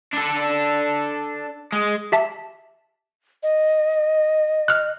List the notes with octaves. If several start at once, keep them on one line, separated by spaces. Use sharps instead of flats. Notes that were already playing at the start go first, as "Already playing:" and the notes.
D4 A4
G#3
G4 E5 A5
D#5
F6 F#6